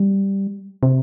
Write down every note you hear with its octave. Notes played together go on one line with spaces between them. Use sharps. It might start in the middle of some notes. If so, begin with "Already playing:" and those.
Already playing: G3
C3